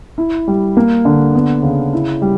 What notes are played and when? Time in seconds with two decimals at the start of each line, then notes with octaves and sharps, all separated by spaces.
0.18 E4
0.48 G3
0.77 A#3
1.05 D3
1.35 B3
1.63 C#3
1.93 E4
2.22 G3